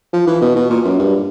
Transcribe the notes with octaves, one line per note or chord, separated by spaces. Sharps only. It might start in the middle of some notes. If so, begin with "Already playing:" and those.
F3
E3
B2
B2
A#2
F#2
G2